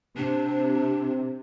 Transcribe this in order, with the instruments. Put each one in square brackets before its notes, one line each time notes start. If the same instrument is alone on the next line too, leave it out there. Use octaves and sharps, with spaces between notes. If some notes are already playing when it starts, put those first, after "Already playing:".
[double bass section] C3 [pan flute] D4